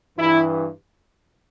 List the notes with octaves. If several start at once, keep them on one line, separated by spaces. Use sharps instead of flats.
G2 E3 E4